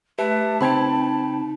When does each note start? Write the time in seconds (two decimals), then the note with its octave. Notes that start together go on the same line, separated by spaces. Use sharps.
0.18 A3 G4 B4 E5 A5
0.61 C#3 C4 D#4 G5 B5 G#6